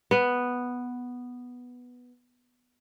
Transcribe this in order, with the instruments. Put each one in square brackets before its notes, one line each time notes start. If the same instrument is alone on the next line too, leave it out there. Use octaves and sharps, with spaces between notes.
[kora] B3 B4